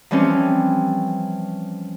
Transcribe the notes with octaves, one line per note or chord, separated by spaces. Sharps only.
E3 F3 G3 C4 C#4